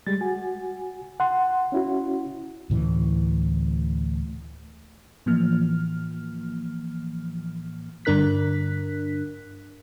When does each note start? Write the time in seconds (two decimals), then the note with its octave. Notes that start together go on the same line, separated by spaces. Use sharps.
0.07 G3 G#3 A6
0.21 F#4 G#5
1.20 F#5 C6
1.72 C#4 E4 F#4
2.70 D2 A2 E3
5.26 A2 E3 F3 A#3 F6
8.05 G2 D3 D4 A#4 F#6 B6